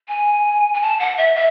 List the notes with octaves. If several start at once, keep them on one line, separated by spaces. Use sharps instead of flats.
G#5
G#5
A5
F#5
E5
E5